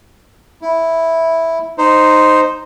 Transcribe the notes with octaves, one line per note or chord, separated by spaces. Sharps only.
E4
D#4 C5